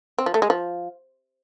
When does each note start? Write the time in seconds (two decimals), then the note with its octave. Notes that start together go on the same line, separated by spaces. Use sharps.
0.18 C4
0.26 F3
0.34 A3
0.42 G#3
0.50 F3